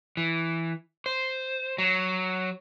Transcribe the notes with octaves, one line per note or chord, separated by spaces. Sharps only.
E3
C5
F#3